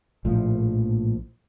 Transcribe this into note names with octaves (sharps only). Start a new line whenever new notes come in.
A#1 A2 F3